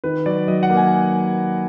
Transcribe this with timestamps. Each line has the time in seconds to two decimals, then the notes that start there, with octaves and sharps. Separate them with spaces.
0.04 D#3 B4
0.26 F#3 D5
0.48 F#3 D#5
0.63 F#5
0.70 A#3
0.77 G#5